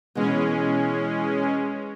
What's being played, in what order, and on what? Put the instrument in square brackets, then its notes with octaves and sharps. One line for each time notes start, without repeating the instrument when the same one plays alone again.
[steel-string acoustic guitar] B2 E3 [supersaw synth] G#3 C#4